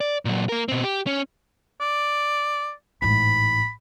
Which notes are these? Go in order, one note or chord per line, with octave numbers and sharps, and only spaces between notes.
D5
A#2 F#3
A#3 A#4
B2 C4
G4
C#4
D5
A1 G#2 B5